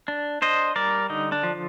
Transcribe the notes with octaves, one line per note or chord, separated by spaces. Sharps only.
D4
D4 C5 D#5
G3 A#4 D5
D3 D#4
D4
F3